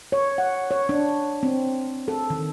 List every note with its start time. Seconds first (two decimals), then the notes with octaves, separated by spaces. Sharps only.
0.12 C#5
0.38 F#5
0.71 C#5
0.89 D4
1.43 C4
2.08 A4
2.30 D#3